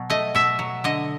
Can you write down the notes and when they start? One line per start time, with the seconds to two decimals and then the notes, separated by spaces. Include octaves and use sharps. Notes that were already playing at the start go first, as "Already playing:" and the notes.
Already playing: B2 F#3
0.10 A3 D#5
0.35 B2 E5
0.59 F#3
0.84 D3 D#5